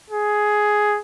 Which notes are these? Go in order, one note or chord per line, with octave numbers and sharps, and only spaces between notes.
G#4